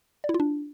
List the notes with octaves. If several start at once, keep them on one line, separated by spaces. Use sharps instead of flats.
D5
E4
F4
D4